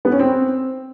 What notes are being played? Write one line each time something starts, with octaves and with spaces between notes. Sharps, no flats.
B3
C#4
C4